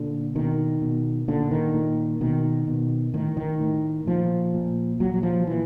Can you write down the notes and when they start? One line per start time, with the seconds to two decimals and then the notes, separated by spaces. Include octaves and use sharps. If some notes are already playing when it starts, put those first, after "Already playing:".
Already playing: A#2 D3
0.35 B2 D#3
0.82 B2
1.28 A#2 D3
1.51 D#3
1.74 A#2
2.21 B2 D#3
2.67 B2
3.14 A2 D#3
3.37 D#3
3.60 A2
4.06 A#2 F3
4.54 A#2
5.00 A#2 F#3
5.14 F#3
5.23 F3
5.47 A#2 E3